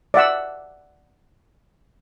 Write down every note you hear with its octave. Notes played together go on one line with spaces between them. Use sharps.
D5 E5 F#5 E6